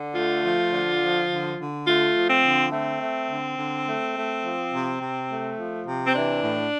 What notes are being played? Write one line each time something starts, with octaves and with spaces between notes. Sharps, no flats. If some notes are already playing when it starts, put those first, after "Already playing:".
Already playing: D3
A3 F4
F3
D3
F3
D3
D3
A3 F4
F3
C4
D3
A3 C4
A3
D3
D3
A3
A3
F3
C3
C3
A3
F3
C3
C4
E3 D4
A2